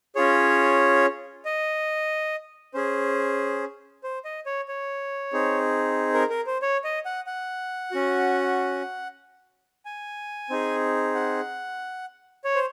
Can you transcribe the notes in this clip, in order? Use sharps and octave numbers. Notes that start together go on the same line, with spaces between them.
C#4 F4 G#4 C#5
D#5
C#4 G#4 C5
C5
D#5
C#5
C#5
C4 D#4 G#4
A#4
A#4
C5
C#5
D#5
F#5
F#5
C#4 F#4
G#5
C4 D#4 G#4
F#5
C#5
C5